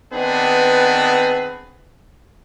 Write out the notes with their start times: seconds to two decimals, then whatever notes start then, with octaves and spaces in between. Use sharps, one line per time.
0.13 D#3 B3 C4 D4 G#4 B4